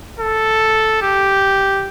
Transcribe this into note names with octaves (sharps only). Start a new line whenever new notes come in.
A4
G4